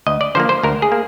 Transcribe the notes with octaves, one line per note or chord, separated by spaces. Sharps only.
D2 D#5
D5
D3 F3 A#3 C5
C5
D2 A#4
G#4
A#3